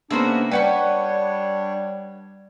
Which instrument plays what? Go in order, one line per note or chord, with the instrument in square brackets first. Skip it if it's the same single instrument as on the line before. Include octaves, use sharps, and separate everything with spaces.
[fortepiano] C#3 A#3 B3 [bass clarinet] D4 [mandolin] F#4 C5 E5
[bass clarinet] G3 [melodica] D4 C#5 [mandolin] B4 F#5 C#6 [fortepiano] G5